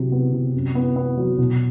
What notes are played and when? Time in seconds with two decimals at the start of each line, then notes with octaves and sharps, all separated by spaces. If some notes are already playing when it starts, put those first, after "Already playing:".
Already playing: C3 F#3
0.12 B3
0.33 C3
0.54 F#2
0.75 B3
0.96 B3
1.17 F#3
1.38 B2